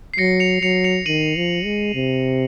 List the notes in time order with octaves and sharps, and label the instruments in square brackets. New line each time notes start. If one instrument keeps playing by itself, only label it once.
[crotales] C7
[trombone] F#3 [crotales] A#6 C#7
[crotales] C#7 F7
[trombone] F#3 [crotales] C#7 F7
[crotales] C#7 F7
[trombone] D#3 [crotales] D#7 F#7
[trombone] F3
G#3
C3